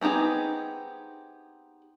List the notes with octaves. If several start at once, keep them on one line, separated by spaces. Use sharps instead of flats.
B3 C4 D#4 G4 G#4